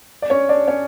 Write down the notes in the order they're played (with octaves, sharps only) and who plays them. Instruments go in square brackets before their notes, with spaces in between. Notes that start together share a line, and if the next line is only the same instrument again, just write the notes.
[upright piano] D5
C#4 C#5
D4 D5
C#4 C#5